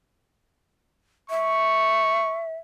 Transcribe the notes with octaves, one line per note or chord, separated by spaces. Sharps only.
E5 C#6